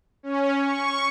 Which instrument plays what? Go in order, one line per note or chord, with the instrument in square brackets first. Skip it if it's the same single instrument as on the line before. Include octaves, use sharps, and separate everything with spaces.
[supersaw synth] C#4
C#6